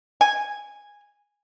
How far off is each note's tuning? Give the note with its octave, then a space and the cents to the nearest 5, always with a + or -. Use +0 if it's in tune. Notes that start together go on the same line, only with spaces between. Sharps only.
G#5 -10